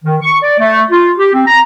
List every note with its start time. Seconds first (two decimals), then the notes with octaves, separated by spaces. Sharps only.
0.04 D#3
0.22 C#6
0.43 D5
0.59 A3
0.91 F4
1.17 G4
1.33 C4
1.46 A#5